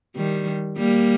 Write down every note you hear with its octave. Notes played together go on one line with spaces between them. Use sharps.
D#3 G3
G3 A#3